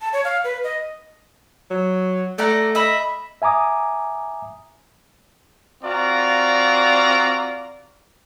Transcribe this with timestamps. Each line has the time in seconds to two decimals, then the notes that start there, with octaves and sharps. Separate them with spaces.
0.01 A5
0.13 C#5
0.24 F5
0.44 B4
0.64 D#5
1.71 F#3
2.38 A3 D5 F#5 A#5
2.75 D#5 E5 B5
3.42 E5 G#5 A#5 D6 D#6
5.83 C4 F4 F#4 D5 F5 A#5